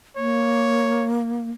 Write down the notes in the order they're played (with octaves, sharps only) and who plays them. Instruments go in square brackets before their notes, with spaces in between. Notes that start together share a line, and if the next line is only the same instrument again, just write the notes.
[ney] A#3 [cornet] C#5